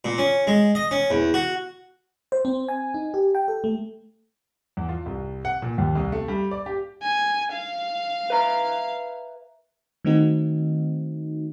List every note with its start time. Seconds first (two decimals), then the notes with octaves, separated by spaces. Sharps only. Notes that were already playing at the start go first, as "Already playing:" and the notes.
0.05 A#2
0.18 C#4
0.47 G#3
0.75 D#5
0.91 C#4
1.11 E2
1.34 F#4
2.32 C5
2.45 C4
2.68 G#5
2.94 D#4
3.14 G4
3.35 G5
3.48 A4
3.64 A3
4.77 E2
4.89 F4
5.06 C2
5.45 F#5
5.62 A#2
5.78 D#2
5.95 C2
6.12 A3
6.28 G3
6.51 D5
6.66 G4
7.02 G#5
7.52 F5
8.30 B4 E5 A#5
10.05 D#3 A3 C4 D#4 F#4